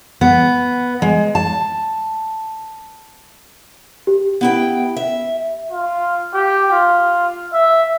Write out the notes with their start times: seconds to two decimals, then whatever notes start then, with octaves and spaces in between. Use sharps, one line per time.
0.21 B3
1.02 G#3
1.35 A5
4.07 G4
4.41 B3 E4 G5
4.96 E5
5.71 F4
6.34 G4
6.72 F4
7.54 E5